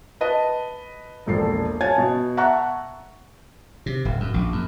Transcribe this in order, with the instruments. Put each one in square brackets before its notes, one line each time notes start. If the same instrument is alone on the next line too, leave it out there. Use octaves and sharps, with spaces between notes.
[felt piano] B4 D#5 A5
E1 A#1 A4 C7
C#5 F5 G#5 A5 G#6 A6
B2
E5 F#5 A5 A#5 C#6 F#6
[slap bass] C3
D1
F#2
A#1
F#2